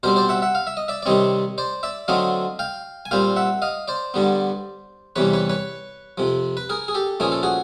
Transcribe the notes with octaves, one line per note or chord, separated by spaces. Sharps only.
B2 G3 C4 A#4 C5
C5 D5
E5 F#5
E5 F#5
F5
E5
D#5
D5 E5
D5
C3 D#3 G3 C4 C#5 D#5
C5 D5
D5 E5
D3 F#3 A3 C4 D#5 F5
F5 G5
G#5
A#2 G3 C4 F5 G5
E5 F#5
D#5 F5
C5 D5
G2 D3 G3 B3
E2 C3 E3 G3 B4 C#5
B4 C#5
B4 C#5
F2 C3 F3
B4
G#4 A#4
G#4
G4 A4
A#2 F3 A3 C#4 G#4
A4
F#4 G#4